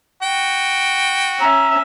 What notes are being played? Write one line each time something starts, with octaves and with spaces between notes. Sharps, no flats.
F#4 G5
C#4 E5 A#5